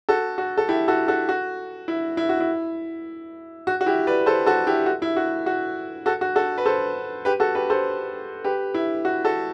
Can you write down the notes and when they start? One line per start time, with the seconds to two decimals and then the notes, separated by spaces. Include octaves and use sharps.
0.09 F#4 A4
0.38 F#4
0.58 A4
0.68 E4 G4
0.88 F#4 A4
1.08 F#4 A4
1.29 F#4
1.88 E4
2.17 E4
2.29 F#4
2.40 E4
3.67 F#4
3.81 F#4
3.86 E4 G4
4.07 B4 D5
4.26 A4 C5
4.46 F#4 A4
4.67 E4 G4
4.86 F#4
5.02 E4
5.17 F#4
5.46 F#4
6.06 F#4 A4
6.21 F#4
6.36 F#4 A4
6.58 B4
6.66 A4 C5
7.25 G4 B4
7.40 F#4 A4
7.55 G4 B4
7.70 A4 C5
8.44 G4 B4
8.74 E4
9.05 F#4
9.25 F#4 A4